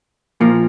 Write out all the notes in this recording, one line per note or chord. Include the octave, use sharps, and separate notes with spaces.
A#2 F3 A#3